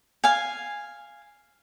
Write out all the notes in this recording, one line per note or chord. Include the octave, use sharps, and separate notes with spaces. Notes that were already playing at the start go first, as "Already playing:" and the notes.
F5 G#5